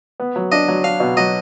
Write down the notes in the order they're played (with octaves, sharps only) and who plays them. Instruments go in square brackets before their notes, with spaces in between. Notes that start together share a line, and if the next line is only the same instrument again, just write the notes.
[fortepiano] B3
F#3
[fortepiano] D4 [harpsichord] D#5
[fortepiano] F#3
[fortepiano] D4 [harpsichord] F5
[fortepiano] B2
[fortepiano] F#3 [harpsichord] D#5